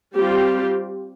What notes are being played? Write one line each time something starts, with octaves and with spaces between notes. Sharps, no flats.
G3 C4 F4 G4